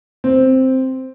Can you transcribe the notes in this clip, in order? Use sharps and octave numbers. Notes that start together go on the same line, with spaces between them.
C4